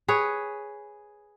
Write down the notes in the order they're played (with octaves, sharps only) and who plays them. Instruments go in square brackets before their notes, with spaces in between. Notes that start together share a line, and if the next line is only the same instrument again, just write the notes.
[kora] G#4 B4 C#5